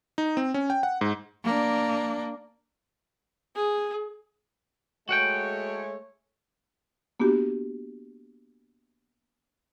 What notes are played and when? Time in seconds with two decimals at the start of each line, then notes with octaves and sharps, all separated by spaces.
0.18 D#4
0.37 C4
0.54 C#4
0.70 G5
0.83 F#5
1.01 G#2
1.44 A#3 D4
3.55 G#4
5.09 G#3 A3 F#4 C#5 F#5 G5
7.20 A#3 B3 D4 F#4 G4